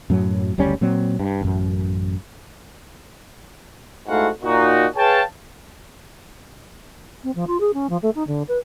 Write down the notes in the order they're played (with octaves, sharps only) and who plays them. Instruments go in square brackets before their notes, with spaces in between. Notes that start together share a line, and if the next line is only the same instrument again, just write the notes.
[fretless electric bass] F#2 A2 F#3
F#1 D2 G3 C#4
A#2 F#3 C4
G2
E1 A1 F#2
[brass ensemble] G#2 A3 E4 F#4 F5 F#5
A#2 D#4 F#4
G#4 B4 C#5 F5 G5 A5
[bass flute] C4
F3
F4
G#4
C#4
F3
A3
D#4
D3
B4